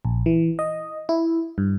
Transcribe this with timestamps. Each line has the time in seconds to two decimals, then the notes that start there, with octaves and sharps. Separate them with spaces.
0.05 A#1
0.26 E3
0.59 D#5
1.09 E4
1.58 G2